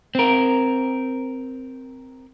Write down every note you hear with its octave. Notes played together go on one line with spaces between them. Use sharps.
C4 A#4